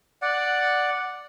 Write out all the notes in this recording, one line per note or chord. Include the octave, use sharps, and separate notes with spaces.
D5 F#5